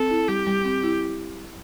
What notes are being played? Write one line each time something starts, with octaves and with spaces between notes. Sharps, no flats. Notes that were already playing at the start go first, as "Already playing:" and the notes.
Already playing: C4 A4
E4
G3 G4
G3
C4
E4